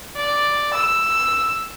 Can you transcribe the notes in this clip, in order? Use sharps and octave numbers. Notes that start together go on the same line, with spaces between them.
D5
E6